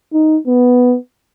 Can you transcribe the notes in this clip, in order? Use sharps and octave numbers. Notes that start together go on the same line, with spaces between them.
D#4
B3